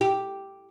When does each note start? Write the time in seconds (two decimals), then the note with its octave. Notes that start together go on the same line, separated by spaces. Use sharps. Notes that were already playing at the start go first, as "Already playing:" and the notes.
0.01 G4